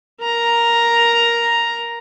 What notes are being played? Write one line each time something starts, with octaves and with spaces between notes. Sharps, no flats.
A#4 A#5